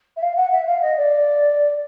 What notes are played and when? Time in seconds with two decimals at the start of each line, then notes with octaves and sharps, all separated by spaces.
0.17 E5
0.22 F5
0.37 F#5
0.52 E5
0.67 F5
0.82 D#5
0.97 D5